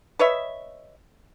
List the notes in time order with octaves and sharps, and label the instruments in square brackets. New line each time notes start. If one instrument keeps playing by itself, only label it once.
[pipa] B4 C#5 D#5 E5